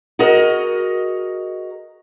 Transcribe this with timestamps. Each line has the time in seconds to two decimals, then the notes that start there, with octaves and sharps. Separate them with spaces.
0.19 F#4 G#4 A#4 D#5